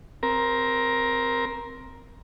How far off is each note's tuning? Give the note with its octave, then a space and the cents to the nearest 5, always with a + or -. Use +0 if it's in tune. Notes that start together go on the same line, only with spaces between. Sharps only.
C4 +0 A#4 +15